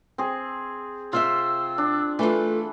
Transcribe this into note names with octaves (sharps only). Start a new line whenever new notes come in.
C4 G#4
C3 C4 F4 E5 E6
D4
E3 A3 F4 A4